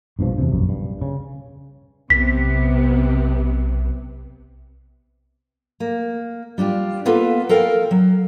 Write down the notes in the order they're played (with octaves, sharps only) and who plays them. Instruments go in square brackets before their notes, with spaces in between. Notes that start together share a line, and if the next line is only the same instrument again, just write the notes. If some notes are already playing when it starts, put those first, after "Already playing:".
[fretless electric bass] A#1 G2 B2 F3
E2 C3
A#1 F#2
G2
C#3
[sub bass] B1 [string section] C3 B3 [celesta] B6
[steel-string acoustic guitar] A#3
G3 D4 F4 G4
A#3 B3 F4 A4 B4
A4 A#4 F5 G5
F#3